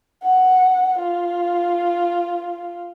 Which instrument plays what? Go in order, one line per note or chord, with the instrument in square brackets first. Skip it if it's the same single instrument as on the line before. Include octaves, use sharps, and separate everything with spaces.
[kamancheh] F#5
F4